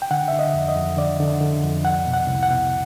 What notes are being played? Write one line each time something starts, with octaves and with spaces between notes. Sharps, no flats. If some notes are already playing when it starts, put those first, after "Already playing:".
G5
D3 F#5
D3 E5
D#5
F2
D#5
F2
D3 D5
D3
D3
F2
C2 F#5
B2
F#5
C2
F#5
B2